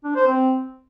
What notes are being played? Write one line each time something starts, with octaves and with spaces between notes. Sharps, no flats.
D4
C5
C4